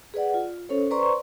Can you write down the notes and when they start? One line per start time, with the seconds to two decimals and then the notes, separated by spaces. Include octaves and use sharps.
0.14 G#4 B4 D5 F#5
0.34 F4
0.69 C#4 A4 C5 C#5
0.91 B4 C5 D5 A#5 C6 C#6